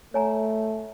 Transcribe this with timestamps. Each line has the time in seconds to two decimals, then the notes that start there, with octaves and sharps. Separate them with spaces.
0.14 A3 C#5 G#5 A#5